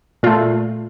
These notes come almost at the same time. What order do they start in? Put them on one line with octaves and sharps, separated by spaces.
A#2 F4 A3